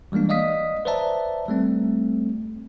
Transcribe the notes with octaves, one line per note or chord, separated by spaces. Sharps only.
E3 G3 G#3 A#3 D4
D5 D#5 F5 D#6 B6
B4 C5 D5 E5 A5 A#5
G3 A3 C4